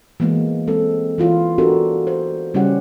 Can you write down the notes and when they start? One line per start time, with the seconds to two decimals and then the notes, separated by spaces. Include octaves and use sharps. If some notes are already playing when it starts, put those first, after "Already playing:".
0.20 E3 G#3 A#3 B3
0.67 G#3 C4 A4
1.18 E3 E4 F4
1.58 B3 D4 F#4 G4 A4 A#4
2.07 C5
2.54 C#3 G3 C#4 E4 G4 F#5